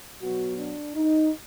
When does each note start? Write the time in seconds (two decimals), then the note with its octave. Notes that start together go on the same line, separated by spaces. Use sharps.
0.22 B2 F#3 B3 F#4
0.58 D4
0.96 D#4